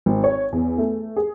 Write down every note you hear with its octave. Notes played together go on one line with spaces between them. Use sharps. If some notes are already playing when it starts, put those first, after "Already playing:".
G#1
C#5
E2
A3
G#4